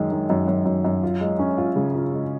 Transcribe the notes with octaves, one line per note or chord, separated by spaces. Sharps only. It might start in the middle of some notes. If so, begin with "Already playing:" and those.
Already playing: F#2 D#3 G#3
D#3
F#2
F#2
F#2
F#2
F4
G#3
C#4
F4
C#3
F4
G#3